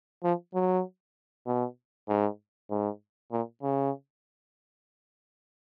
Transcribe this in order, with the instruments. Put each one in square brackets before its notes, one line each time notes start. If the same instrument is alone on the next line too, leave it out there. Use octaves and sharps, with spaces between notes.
[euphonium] F3
F#3
B2
G#2
G#2
A#2
C#3